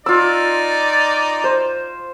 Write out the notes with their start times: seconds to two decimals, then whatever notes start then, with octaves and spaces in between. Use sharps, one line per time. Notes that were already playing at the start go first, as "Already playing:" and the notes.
0.06 D#4 F4 D5 E6
1.44 C5